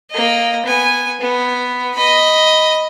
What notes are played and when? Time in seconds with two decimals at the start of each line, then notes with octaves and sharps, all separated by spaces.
0.11 A#3 D#5
0.66 B3 G#5
1.21 B3
1.94 D#5 B5